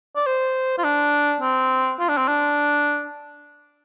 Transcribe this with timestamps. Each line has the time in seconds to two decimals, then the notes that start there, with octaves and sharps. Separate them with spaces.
0.16 D5
0.26 C5
0.78 F4
0.84 D4
1.41 C4
1.99 F4
2.09 D4
2.17 C4
2.28 D4